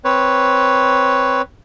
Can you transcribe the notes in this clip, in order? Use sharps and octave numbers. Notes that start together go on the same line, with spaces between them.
C4 B4 C#5